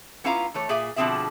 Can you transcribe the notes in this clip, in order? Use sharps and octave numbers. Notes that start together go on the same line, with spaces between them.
B3 C#4 E4 F4 F5 A#5
E3 A3 C#5
A#2 G#4 E5 G#5
B2 D3 F3 C4 G#4 E5